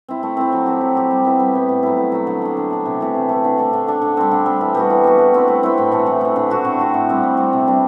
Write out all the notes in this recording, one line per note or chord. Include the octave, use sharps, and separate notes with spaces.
C4 E4
A3
C4 E4
F#3
C4 G4
F#3
C4 G4
G3
B3 E4
G3
B3 E4
A2
F#3 A3 E4
A2
F#3 A3 E4
D3
A3 D4
D3
A3 D4
C3
E3 A3
C3
E3 A3
D3
A3 D4 A4
D3
A3 D4 A4
D3
G3 C4
D3
G3 C4
E3
G3 B3 F#4
E3
G3 B3 F#4
A3
C4 E4 B4
A3
C4 E4 B4
A2
E3 A3
A2
E3 A3
D3
A3 C4 F#4
D3
A3 C4 F#4
A2
G3 C4
A2
G3 C4
C3
G3 B3 D4